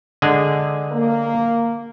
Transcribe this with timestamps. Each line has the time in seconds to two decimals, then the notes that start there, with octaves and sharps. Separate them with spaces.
0.22 D3 G#3 G#4
0.90 A#3